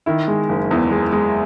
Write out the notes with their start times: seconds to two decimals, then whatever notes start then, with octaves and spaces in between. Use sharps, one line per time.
0.06 D#3 E4
0.28 G#3
0.49 F#1
0.71 E2
0.91 G#3
1.12 G#3